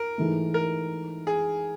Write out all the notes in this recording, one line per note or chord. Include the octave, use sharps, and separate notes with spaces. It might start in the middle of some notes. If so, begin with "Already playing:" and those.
Already playing: A#4
G#2 E3 A3
A#4
G#4